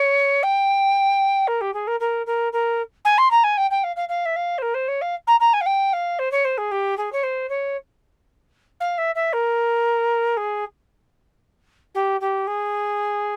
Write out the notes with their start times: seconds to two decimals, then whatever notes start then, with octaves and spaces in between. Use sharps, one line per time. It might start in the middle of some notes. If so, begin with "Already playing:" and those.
Already playing: C#5
0.43 G5
1.47 A#4
1.61 G4
1.74 G#4
1.87 A#4
2.00 A#4
2.26 A#4
2.52 A#4
3.05 G#5
3.18 C6
3.31 A#5
3.44 G#5
3.57 G5
3.71 G5
3.84 F5
3.96 F5
4.09 F5
4.25 E5
4.36 F5
4.58 C5
4.62 A#4
4.74 C5
4.88 C#5
5.01 F5
5.27 A#5
5.40 A#5
5.53 G#5
5.61 F5
5.66 G5
5.93 F5
6.19 C5
6.31 C#5
6.45 C5
6.58 G#4
6.71 G4
6.97 G#4
7.12 C#5
7.23 C5
7.49 C#5
8.80 F5
8.98 E5
9.15 E5
9.33 A#4
10.37 G#4
11.94 G4
12.21 G4
12.47 G#4